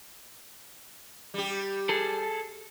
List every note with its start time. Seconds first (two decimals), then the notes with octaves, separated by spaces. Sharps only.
1.34 G3 G4
1.89 G#4 A4